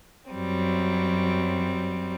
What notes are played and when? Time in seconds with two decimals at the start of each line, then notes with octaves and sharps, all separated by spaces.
0.31 F#2 F#3 G3 C4